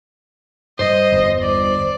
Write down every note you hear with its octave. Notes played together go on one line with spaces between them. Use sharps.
G2 G3 C5 D#5
G1 E2 G2
D5